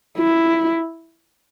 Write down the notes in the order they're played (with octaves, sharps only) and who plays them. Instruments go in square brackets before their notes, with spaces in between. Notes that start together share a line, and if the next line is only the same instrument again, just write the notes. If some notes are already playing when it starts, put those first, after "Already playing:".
[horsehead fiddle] E4